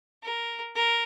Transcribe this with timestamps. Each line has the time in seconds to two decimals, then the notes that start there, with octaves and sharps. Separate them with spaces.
0.23 A#4
0.75 A#4